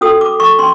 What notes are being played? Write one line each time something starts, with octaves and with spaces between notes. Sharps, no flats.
C#4 F#4 A4 D#6
D6
C#6
C#4 C6